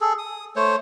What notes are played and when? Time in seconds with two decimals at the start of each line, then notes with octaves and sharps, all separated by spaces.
0.01 G#4 A4
0.18 D#6
0.56 A3 C5 C#5